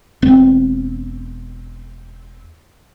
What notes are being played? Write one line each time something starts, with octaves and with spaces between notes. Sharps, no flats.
E1 C4